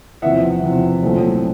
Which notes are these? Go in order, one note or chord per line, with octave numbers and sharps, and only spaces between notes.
E2 C3 F3 E5 F#5
E2 C3 F3
C2 A#2 F#3 A3 C4